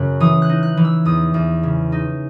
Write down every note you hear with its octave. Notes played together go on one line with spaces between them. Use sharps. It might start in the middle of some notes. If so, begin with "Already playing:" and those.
Already playing: F#2 C#3 F#6
E3 D#6
F#6
D#4
F#6
E3
E6
E2 D#6
E2
C#3
D#4